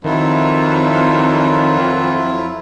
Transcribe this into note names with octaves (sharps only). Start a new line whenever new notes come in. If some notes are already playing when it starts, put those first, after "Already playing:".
F2 D#3 F#3 E4 F4